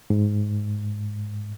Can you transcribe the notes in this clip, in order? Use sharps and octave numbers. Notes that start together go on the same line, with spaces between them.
G#2